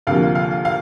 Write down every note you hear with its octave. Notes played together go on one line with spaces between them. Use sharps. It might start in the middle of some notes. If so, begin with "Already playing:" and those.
D2 C3 F3 A#3 F5
F5
F5